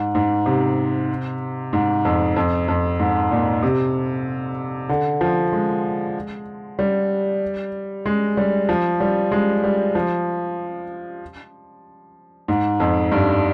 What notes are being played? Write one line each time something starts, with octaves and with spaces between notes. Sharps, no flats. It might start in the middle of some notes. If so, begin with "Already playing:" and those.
Already playing: G#2
G#2
C3
G#2
F2
F2
F2
G#2
A#2
C3
D3
F3
G#3
G3
G#3
G3
F3
G3
G#3
G3
F3
G#2
F2
G2